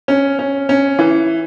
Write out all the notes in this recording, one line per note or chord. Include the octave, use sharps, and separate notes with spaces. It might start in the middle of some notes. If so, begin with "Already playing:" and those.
C#4
C#4
C#4
E3